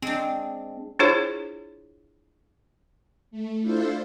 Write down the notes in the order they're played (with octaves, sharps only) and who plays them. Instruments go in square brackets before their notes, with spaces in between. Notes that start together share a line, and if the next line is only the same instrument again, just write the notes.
[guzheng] G#3 D4 [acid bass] C4
[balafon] D4 E4 F4 G#4 C5 C#5
[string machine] A3
D4 E4 F4 A4 C5